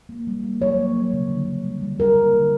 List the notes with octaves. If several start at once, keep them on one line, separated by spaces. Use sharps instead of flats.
A#3
G3
A#3
F#3 C#5
A#3
F#3
C#3
D3
D3
G3
G3
D3 A#4
A#3
D3